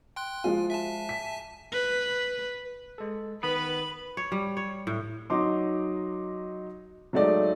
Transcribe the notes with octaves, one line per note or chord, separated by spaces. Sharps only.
G5 C6 F#6
F3 G#3 F4 G#5
E5 G#5 A5
B6
B4
G#3 A4
D#3 B3 B4 B5
C#5
G3
C#5
A2
F#3 D#4 C6 D6
F#3 G#3 A3 D#4 D5 D#5